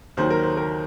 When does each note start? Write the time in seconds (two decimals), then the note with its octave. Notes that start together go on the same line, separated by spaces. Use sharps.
0.17 D#2 D#3 F#3 C5
0.30 A#4
0.43 C5
0.57 A#4